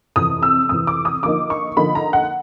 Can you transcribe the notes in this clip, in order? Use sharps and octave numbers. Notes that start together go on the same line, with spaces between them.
F2 C3 E3 D#6
E6
F2 C3 E3 D#6
D6
D#6
D3 F3 A#3 D#4 D6
C#6
D3 F3 A#3 D#4 B5
A#5
F#5